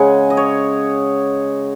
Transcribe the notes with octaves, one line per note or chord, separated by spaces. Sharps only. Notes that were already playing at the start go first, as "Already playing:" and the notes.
Already playing: C#3 G#3 F#5 G#5
D#5
C#5